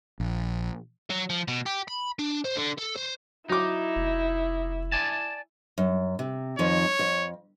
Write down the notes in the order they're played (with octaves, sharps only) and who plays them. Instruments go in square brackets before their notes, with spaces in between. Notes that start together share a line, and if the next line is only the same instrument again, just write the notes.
[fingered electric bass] A#1
[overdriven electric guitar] F#3
F3
B2
G4
B5
D4
C5
D3
A4
C5
[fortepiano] F#3 D6 [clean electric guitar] D#4 [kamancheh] E4
[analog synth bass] F1
[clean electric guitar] D5 G#5 A5
[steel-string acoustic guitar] F#2
C3
[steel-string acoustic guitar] F2 D#3 F3 [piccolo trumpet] C#5
[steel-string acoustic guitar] F2